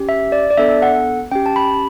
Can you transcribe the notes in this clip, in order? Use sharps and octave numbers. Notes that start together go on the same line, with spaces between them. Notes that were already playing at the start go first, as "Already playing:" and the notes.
Already playing: C#4 G4
E5
D5
D5
B3 D4 A4 E5
F#5
C#4 G4 G5
A5
B5